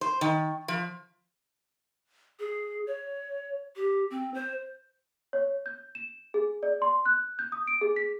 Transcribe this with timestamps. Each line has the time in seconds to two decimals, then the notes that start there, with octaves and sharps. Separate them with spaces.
0.01 C5
0.21 D#3
0.68 F3
2.39 G#4
2.87 C#5
3.76 G4
4.11 C4
4.34 C5
5.33 C#5
5.66 G6
5.95 E7
6.34 G#4
6.63 D5
6.82 C6
7.06 F#6
7.39 G6
7.52 D#6
7.67 D7
7.81 G#4
7.96 B6